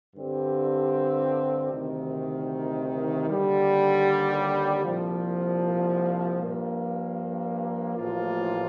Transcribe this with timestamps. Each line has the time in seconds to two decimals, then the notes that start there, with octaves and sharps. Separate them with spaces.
0.15 G2 D3 G3 C4 G4
1.71 D2 C3 D#3
3.28 D#2 D3 G3
4.84 C2 A#2 F3
6.40 G2 F3 A#3
7.96 A1 A2 F3 A#3 F4